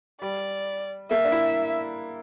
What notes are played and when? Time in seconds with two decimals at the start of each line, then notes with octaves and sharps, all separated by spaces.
0.21 G3 D5
1.10 A#3 E5
1.25 D4
1.32 E4